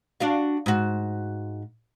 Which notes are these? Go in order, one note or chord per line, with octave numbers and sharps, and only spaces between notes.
D4 F#4 F5
G#2 F#4